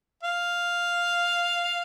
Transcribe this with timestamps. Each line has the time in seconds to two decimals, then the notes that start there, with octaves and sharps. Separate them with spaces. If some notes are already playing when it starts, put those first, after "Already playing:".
0.23 F5